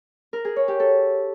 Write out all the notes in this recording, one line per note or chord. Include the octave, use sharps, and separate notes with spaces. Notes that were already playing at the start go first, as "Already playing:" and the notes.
A#4
G#4
C#5
G4
A4